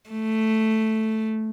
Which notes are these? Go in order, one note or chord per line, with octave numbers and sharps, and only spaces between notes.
A3